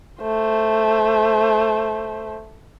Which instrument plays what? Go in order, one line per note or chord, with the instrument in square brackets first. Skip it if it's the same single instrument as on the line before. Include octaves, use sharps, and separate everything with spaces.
[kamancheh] A3 C5